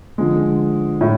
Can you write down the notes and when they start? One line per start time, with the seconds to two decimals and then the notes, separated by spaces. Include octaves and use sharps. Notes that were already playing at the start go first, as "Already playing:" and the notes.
0.18 D3 F3 G#3
1.01 A2